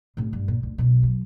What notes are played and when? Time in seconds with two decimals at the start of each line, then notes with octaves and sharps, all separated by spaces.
0.17 A2 C3
0.33 G2
0.48 A#2
0.63 D2
0.78 B1 B2
1.03 F#3